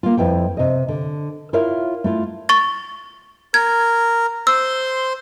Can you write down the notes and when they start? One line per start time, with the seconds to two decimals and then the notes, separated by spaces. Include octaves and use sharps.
0.03 A#3 F4
0.17 F2 E4 B4 G5
0.57 C3 D#5
0.88 D3
1.53 E4 F4 A#4 C#5 E5 F5
2.04 A3 E4 F4
2.49 C#6 A6
3.54 A#4 G#6
4.47 C5 C6 E6